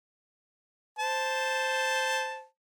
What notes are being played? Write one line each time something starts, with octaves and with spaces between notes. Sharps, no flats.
C5 A5